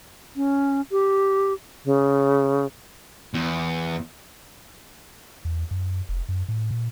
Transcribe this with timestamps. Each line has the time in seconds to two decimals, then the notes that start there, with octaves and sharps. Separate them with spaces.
0.36 C#4
0.91 G4
1.85 C#3
3.34 E2
5.45 E2
5.71 F#2
6.09 F1
6.29 F#2
6.48 A2
6.71 A#2